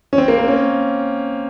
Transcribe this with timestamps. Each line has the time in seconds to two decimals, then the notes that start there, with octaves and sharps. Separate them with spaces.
0.13 C#4
0.18 C4
0.28 A#3
0.38 A#3
0.48 C#4